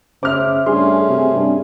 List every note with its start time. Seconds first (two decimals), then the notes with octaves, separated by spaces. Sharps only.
0.23 C#3 C5 E5 D6 F6
0.66 G2 A3 C#4 G#4 C6
1.10 C3
1.35 G2